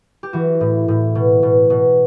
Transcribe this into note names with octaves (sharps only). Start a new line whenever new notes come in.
G4
E3 F#4
A2
A2
B2
B2
B2